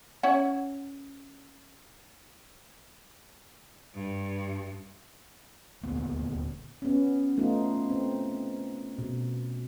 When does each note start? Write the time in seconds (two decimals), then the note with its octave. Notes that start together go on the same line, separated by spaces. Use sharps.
0.23 C#4 E4 F#5
3.95 G2
5.83 D#1 D2 A#3 B3
6.82 B3 C#4
7.38 A3 B3 D#4 F4
7.90 C4
8.98 B2